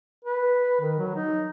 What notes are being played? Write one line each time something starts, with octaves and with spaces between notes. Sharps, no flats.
B4
D#3
F#3
D#4